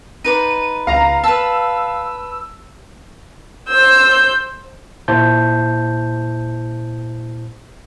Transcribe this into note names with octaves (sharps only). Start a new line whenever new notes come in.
D#4 B4 D5 D#7
C#2 F5 A#5
B4 A5 E6
C5 E6 G6
A#2 E4 C5 A5 G6